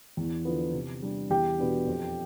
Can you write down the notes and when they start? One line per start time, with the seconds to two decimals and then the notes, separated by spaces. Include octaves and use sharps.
0.17 E2
0.45 D3 F3 B3
0.73 C3
1.02 G3 D4
1.30 E2 G4 G5
1.58 B2 B3 D4
1.86 F2